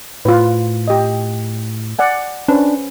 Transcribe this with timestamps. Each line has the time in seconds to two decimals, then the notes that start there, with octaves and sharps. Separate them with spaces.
0.25 A2 F4 B4
0.88 G4 D#5
1.99 D5 F#5 G#5
2.48 C#4 D4 B4 C5